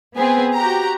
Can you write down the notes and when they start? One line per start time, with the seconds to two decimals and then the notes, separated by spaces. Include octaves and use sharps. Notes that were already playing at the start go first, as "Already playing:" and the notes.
0.15 B3 C4 G#4 B4
0.56 F#4 G4 A#5